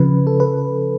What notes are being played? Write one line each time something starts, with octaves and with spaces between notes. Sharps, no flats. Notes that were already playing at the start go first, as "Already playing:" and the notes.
Already playing: C#3 F3 B4
A4
B4